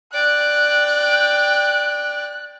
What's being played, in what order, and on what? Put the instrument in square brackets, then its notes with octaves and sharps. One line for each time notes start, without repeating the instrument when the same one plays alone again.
[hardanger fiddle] D5 G5 [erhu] F#6